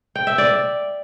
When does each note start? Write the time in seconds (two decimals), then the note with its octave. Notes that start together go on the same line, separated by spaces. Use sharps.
0.15 G5
0.27 E5
0.38 D5